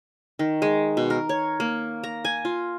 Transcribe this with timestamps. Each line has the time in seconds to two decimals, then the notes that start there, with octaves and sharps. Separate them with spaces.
0.39 D#3
0.62 G#3
0.97 B2
1.10 A#4
1.29 C#5
1.60 A#3
2.03 A#5
2.25 G#5
2.45 F4